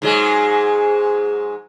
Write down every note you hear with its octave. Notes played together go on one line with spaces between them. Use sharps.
G#2 F#3 G#3